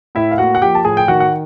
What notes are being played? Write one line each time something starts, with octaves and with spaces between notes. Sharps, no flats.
A2 E4 E5
F5
A#3 F#4 F#5
F#5
F3 G4 G5
A5
A2 G#4 G#5
G5
D#3 F#4 F#5
F#5